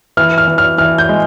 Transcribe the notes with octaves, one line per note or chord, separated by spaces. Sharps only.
E3 F6
F6
E3
F6
E3 F6
G6
G#3